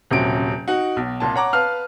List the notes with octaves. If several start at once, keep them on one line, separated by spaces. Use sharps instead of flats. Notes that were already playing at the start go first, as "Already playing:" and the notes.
D#1 C3 F#3 C#4 D7
D#4 F#4 F#5
B1
C2 A#2 A5
C#5 F#5 A#5 D6
B4 F5 A5 F6